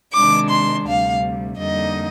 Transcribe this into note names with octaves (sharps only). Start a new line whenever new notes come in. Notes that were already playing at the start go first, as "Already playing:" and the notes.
C3 D#3 G#3 D4 D6
C6
D2 C3 G3 F5
F2 D3 G3 A#3 D#4 D#5